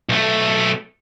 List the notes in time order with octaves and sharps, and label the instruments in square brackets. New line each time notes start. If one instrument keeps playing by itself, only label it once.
[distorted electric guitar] B1 A3